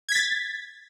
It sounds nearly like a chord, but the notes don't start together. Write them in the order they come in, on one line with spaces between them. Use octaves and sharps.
G#6 B6 A6